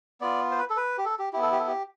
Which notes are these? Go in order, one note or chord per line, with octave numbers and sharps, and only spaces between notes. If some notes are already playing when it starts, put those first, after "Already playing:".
B3 F4 D5
C5
B4
A4
B4
G4
A4
G4
B3 E4 G4
A4
G4
A4
G4